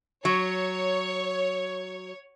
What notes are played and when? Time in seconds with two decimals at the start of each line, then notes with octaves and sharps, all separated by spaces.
0.25 F#3 C#5